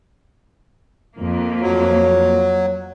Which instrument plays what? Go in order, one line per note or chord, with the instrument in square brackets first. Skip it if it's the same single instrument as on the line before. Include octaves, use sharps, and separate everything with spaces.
[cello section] F2 A#3
[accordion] F#3